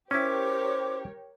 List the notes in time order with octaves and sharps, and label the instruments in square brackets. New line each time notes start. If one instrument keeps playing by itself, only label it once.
[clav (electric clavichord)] C#4 E4 [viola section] G4 A#4 C#5 [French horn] C5 [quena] D6